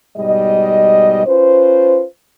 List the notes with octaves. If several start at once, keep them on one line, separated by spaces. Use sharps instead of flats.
G#2 B2 G3 D#5
C#4 F4 B4 C5